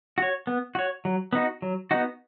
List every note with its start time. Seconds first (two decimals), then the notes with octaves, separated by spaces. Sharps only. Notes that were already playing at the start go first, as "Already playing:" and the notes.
0.18 F#4 C#5
0.47 B3
0.75 F#4 C#5
1.05 F#3
1.33 B3 D#4 F#4
1.62 F#3
1.91 B3 D#4 F#4